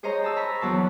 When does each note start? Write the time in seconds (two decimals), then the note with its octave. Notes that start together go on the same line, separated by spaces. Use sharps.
0.03 G#4 C5 C#5 D#5 A#5 C6
0.24 A5 E6
0.36 A#5 B5 C#6
0.61 E2 F#3 A5 C6